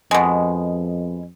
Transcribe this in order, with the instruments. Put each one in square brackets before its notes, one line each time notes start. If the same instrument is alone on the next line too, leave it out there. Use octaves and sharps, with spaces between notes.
[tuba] F2 [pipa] B2 G#3